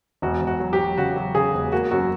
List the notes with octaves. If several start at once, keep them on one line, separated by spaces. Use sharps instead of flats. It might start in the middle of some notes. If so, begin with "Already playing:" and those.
E1 F#4
E1
F#4
F#3
G4
F#3
C#3 F#4
F#3
C#3 G#4
E1
A#3 F#4
F#2 F#4